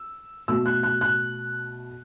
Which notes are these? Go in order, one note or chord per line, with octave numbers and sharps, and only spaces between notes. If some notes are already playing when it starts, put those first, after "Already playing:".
Already playing: E6
B2 A3 E6
F#6
F#6
F#6